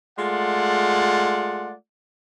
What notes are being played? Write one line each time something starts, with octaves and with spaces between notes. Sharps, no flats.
G#3 A3 F4 D5 F#5